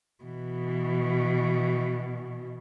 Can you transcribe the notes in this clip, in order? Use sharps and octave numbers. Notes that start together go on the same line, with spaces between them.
B2 E3